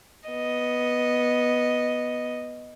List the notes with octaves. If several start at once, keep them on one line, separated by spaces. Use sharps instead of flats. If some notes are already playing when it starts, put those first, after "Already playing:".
B3 D#5